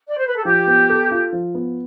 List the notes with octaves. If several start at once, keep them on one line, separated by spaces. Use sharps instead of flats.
D5
C5
B4
A4
F3 G4
B3
A4
F4
F3
B3